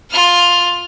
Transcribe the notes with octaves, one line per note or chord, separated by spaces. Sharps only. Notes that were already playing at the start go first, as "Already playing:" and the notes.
F4 F6